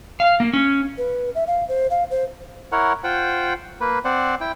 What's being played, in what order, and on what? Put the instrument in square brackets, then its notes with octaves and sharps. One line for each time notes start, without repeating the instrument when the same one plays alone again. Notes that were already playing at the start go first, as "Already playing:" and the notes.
[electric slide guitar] F5
A#3
C#4
[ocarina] B4
E5
F5
C5
F5
C5
[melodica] E4 A#4 C#5 F#5
F4 C5 F#5 G5
A#3 B4
C4 C5 D5 F#5
E4 G5